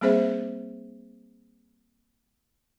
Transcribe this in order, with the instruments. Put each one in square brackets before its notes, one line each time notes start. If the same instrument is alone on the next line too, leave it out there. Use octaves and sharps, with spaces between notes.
[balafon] G3 A#3 C4 G#4 C5 E5